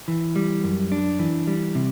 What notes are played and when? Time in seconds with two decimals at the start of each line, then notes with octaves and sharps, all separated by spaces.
0.08 E3
0.36 G3
0.64 F#2
0.92 D4
1.19 E3
1.47 G3
1.75 C3